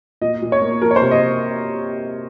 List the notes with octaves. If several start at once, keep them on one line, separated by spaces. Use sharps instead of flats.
A#2 D#5
A#2
C#5
A#3
F3 A#4
C#5
C5
C3
D#5